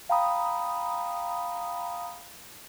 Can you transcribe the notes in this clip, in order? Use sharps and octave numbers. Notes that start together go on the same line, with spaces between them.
F5 G5 A#5 B5 D#6